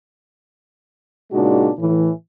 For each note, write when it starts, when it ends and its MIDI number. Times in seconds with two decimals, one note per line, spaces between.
1.33 1.69 46
1.33 1.69 49
1.33 1.69 56
1.33 1.69 62
1.33 1.69 63
1.33 1.69 66
1.79 2.10 45
1.79 2.10 52